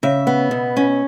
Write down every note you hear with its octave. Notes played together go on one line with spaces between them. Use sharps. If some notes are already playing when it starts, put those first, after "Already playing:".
C#3 E5
B3
B2
C#4